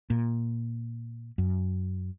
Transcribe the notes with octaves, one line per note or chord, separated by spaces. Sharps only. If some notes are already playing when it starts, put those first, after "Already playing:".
A#2
F#2